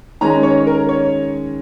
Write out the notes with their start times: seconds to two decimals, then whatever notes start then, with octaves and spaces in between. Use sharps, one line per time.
0.21 D#3 G#3 C#4 A#5
0.43 C#5
0.67 A#4
0.89 C#5